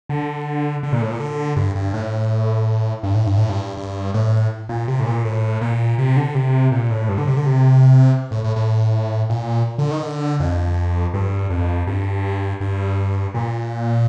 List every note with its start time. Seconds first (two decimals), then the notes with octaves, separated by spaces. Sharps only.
0.09 D3
0.83 D3
0.93 A#2
1.02 A2
1.11 A#2
1.20 D3
1.57 G2
1.75 G2
1.94 A2
3.03 G2
3.14 A2
3.26 G2
3.37 A2
3.49 G2
3.77 G2
4.14 A2
4.69 A#2
4.88 C3
5.00 A2
5.06 A#2
5.25 A2
5.61 A#2
5.98 C3
6.16 D3
6.35 C3
6.72 A#2
6.91 A2
7.09 G2
7.18 D3
7.27 C3
7.37 D3
7.46 C3
8.31 A2
8.44 A2
8.56 A2
9.29 A#2
9.78 D3
9.91 D#3
10.03 D3
10.40 F2
11.14 G2
11.50 F2
11.87 G2
12.61 G2
13.34 A#2